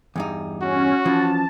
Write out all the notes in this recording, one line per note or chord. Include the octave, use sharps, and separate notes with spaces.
E2 G2 D#4
C#4 F#4
E3 F3 C#4 A5